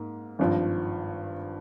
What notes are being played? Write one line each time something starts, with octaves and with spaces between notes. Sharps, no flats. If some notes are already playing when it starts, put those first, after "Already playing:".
Already playing: G#2 A#3
G#1 G2 F3